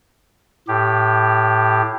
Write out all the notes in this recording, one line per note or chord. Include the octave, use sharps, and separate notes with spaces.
A2 G4